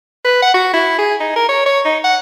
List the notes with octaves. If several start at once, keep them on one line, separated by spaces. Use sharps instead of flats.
B4
F#5
F#4
E4
G#4
D#4
A#4
C#5
C#5
D#4
F#5